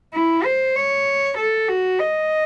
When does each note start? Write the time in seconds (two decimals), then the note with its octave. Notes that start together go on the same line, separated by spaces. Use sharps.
0.13 E4
0.44 C5
0.75 C#5
1.37 A4
1.68 F#4
1.99 D#5